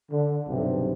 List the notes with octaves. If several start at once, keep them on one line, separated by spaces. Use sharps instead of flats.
D3
B1 G2 C3